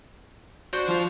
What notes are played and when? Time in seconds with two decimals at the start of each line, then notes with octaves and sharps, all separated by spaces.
0.73 D4 F#4 C5
0.89 F3 F4